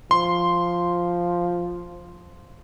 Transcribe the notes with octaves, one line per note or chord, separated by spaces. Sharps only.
F3 C6